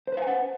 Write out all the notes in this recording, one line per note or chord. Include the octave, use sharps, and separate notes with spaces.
B4 C5 F5 F#5 G#5